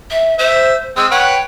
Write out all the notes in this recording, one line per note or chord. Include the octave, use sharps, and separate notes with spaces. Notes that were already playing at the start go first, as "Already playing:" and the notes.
E5
C5 E5
G#3 C4 E6
B4 C#5 F#5 G5